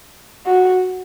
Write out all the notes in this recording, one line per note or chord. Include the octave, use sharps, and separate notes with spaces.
F#4